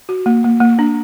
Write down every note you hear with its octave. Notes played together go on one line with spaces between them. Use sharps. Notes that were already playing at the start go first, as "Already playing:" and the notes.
F#4
A#3
A#3
A#3
D4